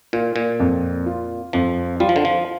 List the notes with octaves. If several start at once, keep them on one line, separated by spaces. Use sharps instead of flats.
A#2 F4
A#2
F2
F4
F2 F3
G3 F4
F3
D3
F3